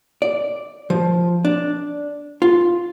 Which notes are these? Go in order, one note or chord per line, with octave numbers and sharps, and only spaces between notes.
D5
F3
D4
F4